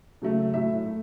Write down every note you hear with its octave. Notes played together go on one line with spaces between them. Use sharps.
C#3 F#3 A3
A2 F#3 A3 E5
A3